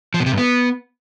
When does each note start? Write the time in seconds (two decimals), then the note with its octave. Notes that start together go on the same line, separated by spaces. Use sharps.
0.14 F3
0.20 B2
0.26 C3
0.32 G2
0.38 B3